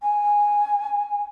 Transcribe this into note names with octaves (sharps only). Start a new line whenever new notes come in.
G#5